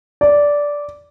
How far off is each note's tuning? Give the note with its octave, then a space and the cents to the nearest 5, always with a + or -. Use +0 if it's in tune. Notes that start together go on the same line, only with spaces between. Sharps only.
D5 -10